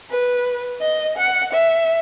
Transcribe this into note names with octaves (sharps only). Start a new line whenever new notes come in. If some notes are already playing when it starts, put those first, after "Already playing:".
B4
D#5
F#5
E5